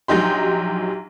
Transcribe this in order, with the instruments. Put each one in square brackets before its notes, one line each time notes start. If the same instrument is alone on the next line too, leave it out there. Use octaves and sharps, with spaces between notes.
[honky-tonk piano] A#1 F#3 D#4 G4 C6